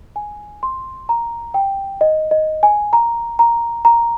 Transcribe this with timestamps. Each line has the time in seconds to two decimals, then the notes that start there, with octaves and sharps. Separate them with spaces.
0.16 G#5
0.63 C6
1.09 A#5
1.54 G5
2.01 D#5
2.31 D#5
2.63 G#5
2.93 A#5
3.39 A#5
3.85 A#5